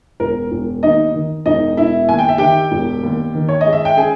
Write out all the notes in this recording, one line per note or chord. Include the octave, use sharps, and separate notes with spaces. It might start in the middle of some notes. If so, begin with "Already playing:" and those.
E1 A#4
E1
D#2 D#4 D#5
D#3
E1 D#4 D#5
E1 E4 E5
D#2 G#5
G5
E5
D#3 G4 G5
E1
D#2
D#3
C#5
D#5
G#3
E5
G5
C#4 G#4 G#5